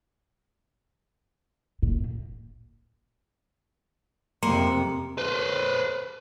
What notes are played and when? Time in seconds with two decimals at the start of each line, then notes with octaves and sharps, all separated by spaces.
1.82 A#2
4.43 F2 C3 A#3 A#5 C6 C#7
5.18 B4 C5